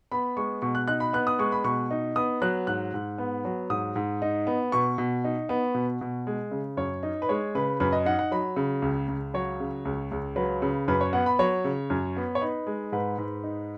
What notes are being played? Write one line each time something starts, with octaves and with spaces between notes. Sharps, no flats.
B3 B5
G#3 C#6
B2 C#6
F#6
D#4 F#6
B5
B3 F#6
D#6
G#3 C#6
B5
B2 C#6
D#4
B3 D#6
F#3 F#6
G#2 F#6
G#2
B3
F#3
G#2 D#6
G#2
D#4
B3
B2 C#6
B2
D#4
B3
B2
B2
G#3
C#3
F#2 C#5
D#4
B4
G#3 C#5
C#3 B4
F#2 B4
D#5
D#4 F#5
F#5
F#3 B5
C#3
C#2
C#2
F#3 C#5
C#3
C#2
C#2
F#3 B4
C#3
F#2 B4
C#5
B3 F#5
B5
F#3 C#5
C#3
F#2
B3
C#5
D#4 B4
G#3
G#2 B4
G#2
D#4